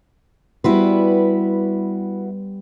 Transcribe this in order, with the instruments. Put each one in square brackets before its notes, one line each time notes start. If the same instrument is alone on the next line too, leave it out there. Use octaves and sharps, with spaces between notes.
[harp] G3 B3 C6 [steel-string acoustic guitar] E4 F#4 B4